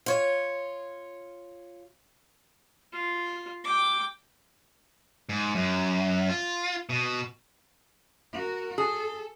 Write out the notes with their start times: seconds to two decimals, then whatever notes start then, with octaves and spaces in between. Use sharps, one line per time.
0.06 F4 C#5
2.93 F4
3.64 G5 D6
5.29 G#2
5.55 F#2
6.29 F4
6.89 B2
8.32 F#4 A#4
8.78 G#4 A4